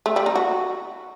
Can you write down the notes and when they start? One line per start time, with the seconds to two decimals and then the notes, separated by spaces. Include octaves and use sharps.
0.06 A3
0.16 G3
0.26 D#4
0.35 F#4